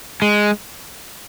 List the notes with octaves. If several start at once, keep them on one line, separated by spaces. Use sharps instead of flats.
G#3